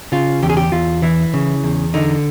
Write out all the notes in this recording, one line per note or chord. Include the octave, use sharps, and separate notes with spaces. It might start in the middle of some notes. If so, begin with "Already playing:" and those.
C#3 F4
E2 G4
G#4
G4
E2 F4
E3 E4
C#3
E2
D3 D#4